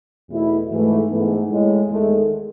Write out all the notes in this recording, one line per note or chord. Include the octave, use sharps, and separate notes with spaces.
E2 B2 A3 E4
G#2 E3 A3
G#2 E3 A3 B3
A2 G#3
E2 D#3 G#3 A3